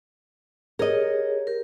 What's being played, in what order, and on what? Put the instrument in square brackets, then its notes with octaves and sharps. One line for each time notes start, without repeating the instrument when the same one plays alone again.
[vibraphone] G4 G#4 C#5 [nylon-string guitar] A#4 D#5
[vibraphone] G4 A#4